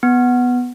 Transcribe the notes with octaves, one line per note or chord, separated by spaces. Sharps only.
B3